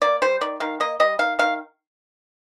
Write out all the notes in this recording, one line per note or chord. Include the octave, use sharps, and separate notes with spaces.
A#3 D5
G3 C5
D#3 D5
D#3 F5
A#3 D#5
G3 D#5
D#3 F5
D#3 F5